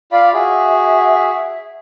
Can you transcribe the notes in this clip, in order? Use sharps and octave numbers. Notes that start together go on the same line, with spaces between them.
F4 D5 F5 B5
F#4 G#4 E5